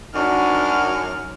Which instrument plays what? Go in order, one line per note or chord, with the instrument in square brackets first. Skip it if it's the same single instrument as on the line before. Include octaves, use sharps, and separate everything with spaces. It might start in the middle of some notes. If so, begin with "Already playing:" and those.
[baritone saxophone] F#2 [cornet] D4 [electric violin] D#4 F6 [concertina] F#4